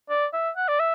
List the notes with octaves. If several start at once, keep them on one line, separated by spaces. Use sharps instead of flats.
D5
E5
F#5
D5
E5